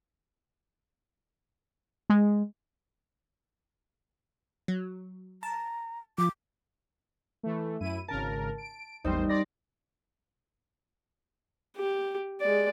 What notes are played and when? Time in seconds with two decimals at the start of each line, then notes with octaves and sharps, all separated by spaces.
2.10 G#3
4.68 F#3
5.43 A5 A#5
6.18 F3 D6
7.43 E3 A3
7.80 F#2 E4 D#7
8.08 G#1 C#3 A#4 A5
8.58 D7
9.04 A1 E2 G3 C4 D#4 C5
9.29 D5 C6 A#6
11.77 G4
12.41 G#3 D5